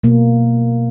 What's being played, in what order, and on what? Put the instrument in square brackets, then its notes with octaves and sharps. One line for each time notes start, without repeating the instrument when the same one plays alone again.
[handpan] B2 A#3